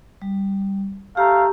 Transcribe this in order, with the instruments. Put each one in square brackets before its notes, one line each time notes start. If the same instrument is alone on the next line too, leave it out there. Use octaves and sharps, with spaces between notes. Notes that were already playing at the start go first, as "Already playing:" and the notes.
[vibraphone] G3
[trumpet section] A3 F5 A#5 [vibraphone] G4